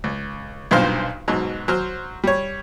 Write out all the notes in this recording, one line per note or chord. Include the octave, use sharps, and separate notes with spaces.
C#2
B1 G2 A#2 F4 C5 F6
G#2 B2 F#3
F#3 C5 F6
G3 C#5